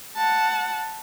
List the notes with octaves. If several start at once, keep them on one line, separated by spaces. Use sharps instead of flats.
F#5 A5